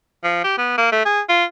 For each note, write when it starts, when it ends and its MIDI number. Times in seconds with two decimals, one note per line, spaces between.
0.24 0.39 53
0.44 0.54 67
0.58 0.75 59
0.78 0.89 58
0.92 1.03 57
1.05 1.21 68
1.29 1.44 65